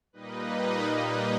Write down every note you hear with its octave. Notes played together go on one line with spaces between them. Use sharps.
A#2 G3 A#3 D#4 B4 D#5
B4 D#5